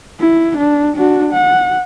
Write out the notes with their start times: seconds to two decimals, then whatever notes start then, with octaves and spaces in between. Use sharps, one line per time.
0.20 E4
0.58 D4
0.96 D4 F#4
1.32 F#5